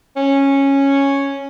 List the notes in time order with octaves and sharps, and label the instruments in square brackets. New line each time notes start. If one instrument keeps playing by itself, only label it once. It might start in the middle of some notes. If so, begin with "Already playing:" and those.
[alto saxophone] C#4